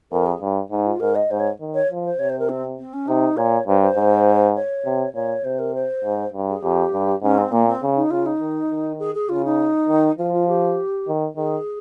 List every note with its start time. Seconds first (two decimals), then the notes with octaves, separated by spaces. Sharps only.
0.12 F2 A#4
0.26 G#4
0.41 G2
0.71 G#2 D#4
0.86 F4
1.00 G#2 A#4
1.15 D#5
1.30 G#2 C5
1.40 C#5
1.60 D#3
1.74 C#5
1.90 F3
2.04 C5
2.18 C3 C#5
2.29 C5
2.39 A#4
2.49 C4
2.79 C4
2.93 C#4
3.08 C3 D#4
3.37 A#2 C#5
3.67 G2 C5
3.81 C5
3.96 G#2
4.56 C#5
4.85 C3
5.15 A#2 C#5
5.44 C3 C5
5.59 A#4
5.75 C5
6.04 G#2
6.34 G2
6.49 G#4
6.63 F2 G4
6.93 G2
7.22 G#2 C#4
7.38 C4
7.52 A#2 A#3
7.67 C4
7.82 C#3
7.96 D#4
8.11 C#3 F4
8.26 D#4
8.41 D#3
8.70 D#3
8.99 G#4
9.15 G#4
9.29 C#3 F4
9.45 D#4
9.89 D#3
10.18 F3 F4
10.34 F4
10.48 G4
11.08 D#3
11.37 D#3 G#4